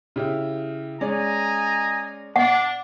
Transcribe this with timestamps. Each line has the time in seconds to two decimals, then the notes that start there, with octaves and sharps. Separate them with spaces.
0.16 C#3 E4 G4
1.01 G#3 C#4 D5 D#5 G#5 A#5
2.36 D4 F#5